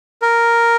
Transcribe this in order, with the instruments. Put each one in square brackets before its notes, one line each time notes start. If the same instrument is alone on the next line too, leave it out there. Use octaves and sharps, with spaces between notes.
[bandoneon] A#4